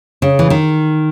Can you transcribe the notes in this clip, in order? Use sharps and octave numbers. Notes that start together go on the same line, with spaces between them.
C#3
E3
D#3